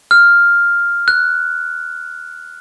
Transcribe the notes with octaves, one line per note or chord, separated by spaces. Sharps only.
F6
F#6